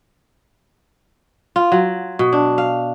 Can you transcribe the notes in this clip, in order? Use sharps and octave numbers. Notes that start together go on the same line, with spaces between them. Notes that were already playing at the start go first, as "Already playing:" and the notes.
F4
F#3
B2
D4
F5